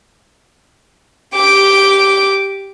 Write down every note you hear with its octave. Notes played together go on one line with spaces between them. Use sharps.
G4 D6